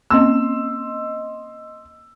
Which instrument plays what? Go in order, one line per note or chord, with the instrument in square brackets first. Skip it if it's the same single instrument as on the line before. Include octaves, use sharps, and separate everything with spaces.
[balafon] A#3 C4 C#4 [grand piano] D#5 C6 E6